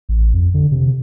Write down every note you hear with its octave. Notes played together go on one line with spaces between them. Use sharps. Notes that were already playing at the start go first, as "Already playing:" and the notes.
A1
F2
D3
C3